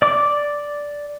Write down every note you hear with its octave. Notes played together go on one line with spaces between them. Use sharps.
D5 D6